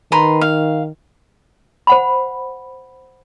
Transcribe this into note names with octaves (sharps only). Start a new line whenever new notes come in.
D#3 B4 A#5 C6
F5
C5 F#5 B5